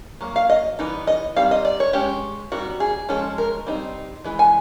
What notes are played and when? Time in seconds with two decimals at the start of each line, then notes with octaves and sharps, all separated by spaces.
0.21 F#3 A#3
0.36 F5
0.49 D#5
0.79 E3 G3 B3 D#4
1.07 D#5
1.36 G3 C4 D#4 F5
1.51 D#5
1.65 D5
1.80 C#5
1.93 G#3 C#4 G4
2.52 D#3 G3 C4 F#4
2.80 G#4
3.09 F3 G#3 C#4 A4
3.38 A#4
3.67 G3 C4 D#4
4.24 E3 G#3
4.39 G#5